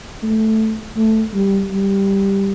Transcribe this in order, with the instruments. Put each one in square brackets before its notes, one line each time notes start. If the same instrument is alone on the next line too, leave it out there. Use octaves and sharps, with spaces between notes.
[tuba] A3
A3
G3
G3